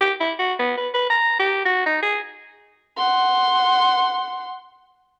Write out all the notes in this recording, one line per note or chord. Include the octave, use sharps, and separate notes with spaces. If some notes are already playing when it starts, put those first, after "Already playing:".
G4
E4
F#4
B3
B4
B4
A#5
G4
F#4
D#4
G#4
F#5 C6